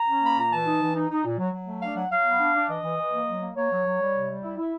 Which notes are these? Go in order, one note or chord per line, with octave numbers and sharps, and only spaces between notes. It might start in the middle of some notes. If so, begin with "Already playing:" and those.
Already playing: A#5
C#4
A#3 B5
A#2 A#5
E3 A5
D#4
E3
D#4
D#4
A#2
F#3
F#3
A3
D4 F5
F#3 F#5
F#3 F5
B3
D4
D4
E3 D#5
E3
E3
A#3
F#3
A#3
A#3 C#5
F#3
F#3
G3
C3
G3
E4
E4